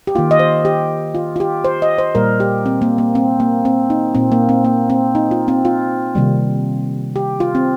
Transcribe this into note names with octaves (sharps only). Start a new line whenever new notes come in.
G4
D#3 A#3 F4
D#5
C5
G4
F4
F4
G4
C5
D#5
C5
A#2 G3 A#3 A#4
G4
C4
A#3
A#3
C4
A#3
C4
D#4
A#2 A#3 C4
A#3
C4
A#3
C4
D#4
F4
C4
F4
C3 D#3 G3 A#3
G4
F4
C4